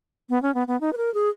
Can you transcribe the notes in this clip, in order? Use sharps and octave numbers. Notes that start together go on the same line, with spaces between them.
B3
C#4
B3
B3
D#4
B4
A#4
G#4